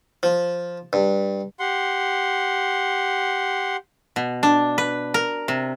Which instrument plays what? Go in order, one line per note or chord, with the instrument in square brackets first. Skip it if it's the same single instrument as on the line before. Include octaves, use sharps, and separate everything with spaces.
[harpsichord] F3
G2
[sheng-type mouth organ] G4 F#5 C6
[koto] B2
D4
B4
A#4
C3